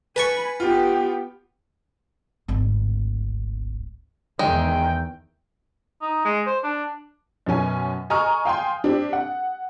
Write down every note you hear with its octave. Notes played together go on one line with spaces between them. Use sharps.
B4 G#5 A5 B5 C#6
B3 F4 G4
D1 G#1
E2 D#3 G#3 G5
D#4
G#3
C5
D4
F#2 B2 C#4 G#5
D#5 G#5 A#5 C#6 D#6 F6
F5 G5 G#5 C6
C4 D4 G4
F#5